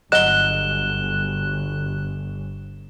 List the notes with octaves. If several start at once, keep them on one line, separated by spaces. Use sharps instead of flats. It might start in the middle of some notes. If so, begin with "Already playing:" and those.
G1 F#3 D#5 F#6 E7 G7